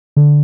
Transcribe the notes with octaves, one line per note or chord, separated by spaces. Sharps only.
D3